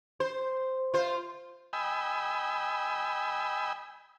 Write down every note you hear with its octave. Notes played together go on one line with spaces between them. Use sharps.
C5
F4 C5
D#5 G5 G#5 B5 E6